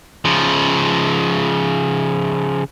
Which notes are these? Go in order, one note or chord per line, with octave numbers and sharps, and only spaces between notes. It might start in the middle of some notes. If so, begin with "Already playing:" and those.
C#3 F3